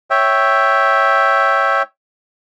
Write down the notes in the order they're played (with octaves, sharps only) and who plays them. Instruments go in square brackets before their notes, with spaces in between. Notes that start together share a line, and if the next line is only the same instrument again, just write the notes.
[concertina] C#5 E5 G5